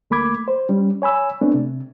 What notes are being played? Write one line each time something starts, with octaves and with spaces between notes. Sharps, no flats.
D2 A3 A#3 B5 D6 G#6
C5
G3 C#4
C#5 G#5 B5 E6
A3 B3 C4 D4
C3